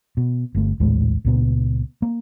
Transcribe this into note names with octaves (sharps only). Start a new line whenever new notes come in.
B2
G1 A3
A#1 D#2 A2 G#3
C#2 A#2 B3
A#3